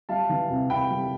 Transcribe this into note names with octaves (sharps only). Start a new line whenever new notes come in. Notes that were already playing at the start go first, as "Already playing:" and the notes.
G3 F5 A5
E3
C3
C3 G5 B5
G3